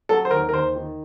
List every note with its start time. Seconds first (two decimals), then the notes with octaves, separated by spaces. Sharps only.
0.09 F#3 A4
0.25 C5
0.31 D#2 A#4
0.49 A#4
0.53 D#2 C5
0.75 D#3